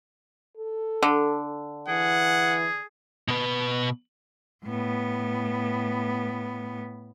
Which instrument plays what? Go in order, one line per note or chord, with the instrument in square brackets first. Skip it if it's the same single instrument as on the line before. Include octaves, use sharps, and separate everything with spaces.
[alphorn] A4
[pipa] D3
[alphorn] E3 [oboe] G#4 [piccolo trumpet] F#5
[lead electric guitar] B2 B4
[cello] A2 B3